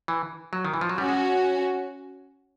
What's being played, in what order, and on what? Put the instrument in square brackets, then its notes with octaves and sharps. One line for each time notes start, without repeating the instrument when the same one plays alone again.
[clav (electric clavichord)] E3
F#3
D#3
E3
F3
F#3
[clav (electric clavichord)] G3 [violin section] C#4 F#4
[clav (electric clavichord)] G#3